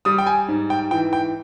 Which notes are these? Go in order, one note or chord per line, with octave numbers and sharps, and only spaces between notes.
G3 D#6
G5
G#5
G#2
G5
E3 G5
G5